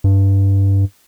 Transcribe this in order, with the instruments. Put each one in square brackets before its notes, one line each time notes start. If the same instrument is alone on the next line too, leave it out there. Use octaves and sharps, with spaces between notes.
[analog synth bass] G2